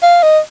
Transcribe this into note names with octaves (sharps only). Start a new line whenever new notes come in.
F5
D#5